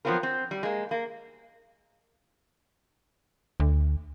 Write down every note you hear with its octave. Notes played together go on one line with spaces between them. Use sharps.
F3 F#3 B3 C4 F4 A#4
C4
G3
G#3 A#3
A#3
D2